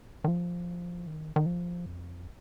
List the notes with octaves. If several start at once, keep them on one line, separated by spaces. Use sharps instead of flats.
D#3
F3
D#3
D#3
F3
F2